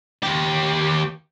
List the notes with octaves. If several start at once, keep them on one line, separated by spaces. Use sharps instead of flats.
D#2 G4